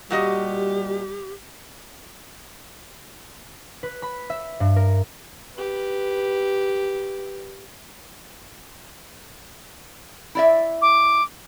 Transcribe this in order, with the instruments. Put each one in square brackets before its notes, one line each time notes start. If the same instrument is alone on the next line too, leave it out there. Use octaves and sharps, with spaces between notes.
[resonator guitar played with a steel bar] A#2 F#4 D#5 [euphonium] G3 [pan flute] G4
[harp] B4
B5
E5
G2
A#4
[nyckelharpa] G4 B4
[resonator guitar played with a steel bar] E4 D5 E5
[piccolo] D6